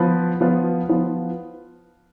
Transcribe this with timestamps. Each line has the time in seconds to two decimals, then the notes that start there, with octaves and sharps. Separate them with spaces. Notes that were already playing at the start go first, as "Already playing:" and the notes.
Already playing: F3 B3 F4 B4
0.41 F3 B3 F4 B4
0.89 F3 B3 F4 B4